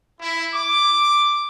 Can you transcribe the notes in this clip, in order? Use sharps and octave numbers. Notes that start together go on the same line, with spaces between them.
E4
D6